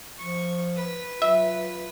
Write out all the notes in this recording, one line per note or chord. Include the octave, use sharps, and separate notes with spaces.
F3 C#6
B4
F#3 F4 E5